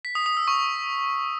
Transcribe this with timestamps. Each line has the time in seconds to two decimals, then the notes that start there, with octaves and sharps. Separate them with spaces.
0.05 B6
0.15 D#6
0.26 D#6
0.37 E6
0.48 C#6